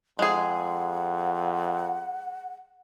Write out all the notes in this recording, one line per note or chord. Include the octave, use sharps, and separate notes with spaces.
F2 G#3 G#4 F#5